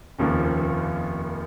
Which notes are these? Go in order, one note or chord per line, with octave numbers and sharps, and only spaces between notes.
F1 D#2 C#3 F3 A#3